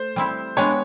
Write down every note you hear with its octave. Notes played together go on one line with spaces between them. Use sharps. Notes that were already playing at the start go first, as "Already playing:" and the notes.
Already playing: A3 C5
G3 C4 E4
G#3 B3 D4 G4 C#5